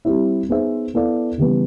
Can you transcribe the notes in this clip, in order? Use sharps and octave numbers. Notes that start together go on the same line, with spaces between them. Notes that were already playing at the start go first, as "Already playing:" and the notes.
G3 C4 E4
B3 D#4 G#4 C5 E5
B3 E4 A4 D5 F5
C#3 E3 G3 B3